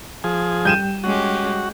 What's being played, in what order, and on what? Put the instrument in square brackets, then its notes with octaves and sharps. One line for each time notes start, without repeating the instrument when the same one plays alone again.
[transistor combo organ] F3 G#4
[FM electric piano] G3 G5 [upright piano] G6 D#7 E7
[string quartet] G#3 C#4 G4 [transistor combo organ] F#4